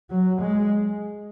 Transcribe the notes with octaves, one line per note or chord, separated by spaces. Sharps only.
F#3
G#3